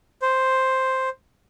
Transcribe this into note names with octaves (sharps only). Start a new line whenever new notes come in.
C5